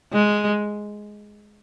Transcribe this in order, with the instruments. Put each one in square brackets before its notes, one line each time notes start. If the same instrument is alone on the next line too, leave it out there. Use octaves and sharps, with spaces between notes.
[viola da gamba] G#3